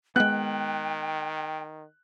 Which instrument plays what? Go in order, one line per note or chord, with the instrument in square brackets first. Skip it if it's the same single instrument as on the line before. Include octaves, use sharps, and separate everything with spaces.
[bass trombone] D#3 [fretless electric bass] G#3 B3 [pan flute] G5 [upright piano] F#6